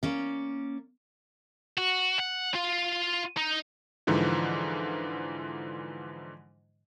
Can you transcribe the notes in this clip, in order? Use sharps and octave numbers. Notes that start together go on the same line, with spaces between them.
A#3 C#4 D5
F#4
F#5
F4
D#4
G#2 D3 E3 F3